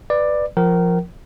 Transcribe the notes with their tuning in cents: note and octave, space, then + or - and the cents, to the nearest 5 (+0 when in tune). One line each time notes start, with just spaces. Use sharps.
B4 +0 D5 +15
F3 +0 A#4 +0 G5 -45